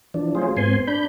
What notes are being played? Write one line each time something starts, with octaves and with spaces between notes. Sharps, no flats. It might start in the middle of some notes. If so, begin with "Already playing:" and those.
E3 F3 D4
F#3 A3 C#4 F4 G#4 C5
G#2 B3 C4 G#5 C6
D4 B5 G6